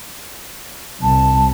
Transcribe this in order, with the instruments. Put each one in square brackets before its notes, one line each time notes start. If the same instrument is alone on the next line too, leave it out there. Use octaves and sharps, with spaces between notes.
[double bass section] C2 [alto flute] A5